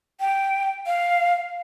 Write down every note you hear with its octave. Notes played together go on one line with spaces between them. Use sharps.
G5
F5